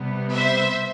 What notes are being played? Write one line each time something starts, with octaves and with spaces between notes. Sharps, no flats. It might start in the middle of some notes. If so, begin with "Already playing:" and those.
Already playing: C3 G3 B3
C5 E5